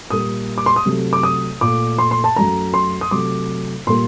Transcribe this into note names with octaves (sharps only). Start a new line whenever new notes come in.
A#2 G3 A#3 D#6
D6
C6
D#6
C3 F#3 A3
D6
D#6
A#2 A3 D6
C6
C6
A5
F#2 F#3 A3 A#5
C6
D#6
C3 F#3 A3 D6
A#2 G3 A#3 C6